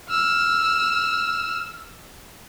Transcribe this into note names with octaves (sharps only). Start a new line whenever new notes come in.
E6 F6